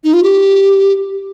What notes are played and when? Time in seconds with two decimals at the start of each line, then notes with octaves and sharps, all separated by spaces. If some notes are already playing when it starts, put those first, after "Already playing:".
0.04 D#4
0.14 F4
0.23 G4